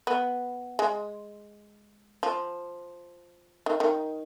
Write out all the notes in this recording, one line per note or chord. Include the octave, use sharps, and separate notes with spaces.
B3
G#3
F3
D#3
D#3